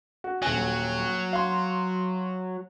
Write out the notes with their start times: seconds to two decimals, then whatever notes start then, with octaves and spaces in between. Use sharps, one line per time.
0.24 F#4
0.42 D#1 F#3 G#5
1.33 F5 C6